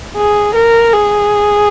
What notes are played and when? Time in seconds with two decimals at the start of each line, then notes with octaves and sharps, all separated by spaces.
0.16 G#4
0.55 A#4
0.93 G#4